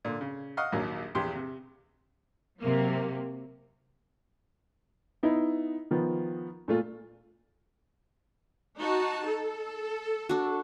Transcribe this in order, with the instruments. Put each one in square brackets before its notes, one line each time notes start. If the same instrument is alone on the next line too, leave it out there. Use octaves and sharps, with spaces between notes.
[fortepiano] A#2 D3
C#3
D#5 F5 F#5 C#6 F6
A#1 D#2 F#3 A#3
A#1 E2 G4 C6
C3
[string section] C3 F#3 A#3
[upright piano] B3 D#4 E4
D#3 F3 B3
A#2 A3 F4
[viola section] D#4 F#4 A5
A4
[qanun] D4 F#4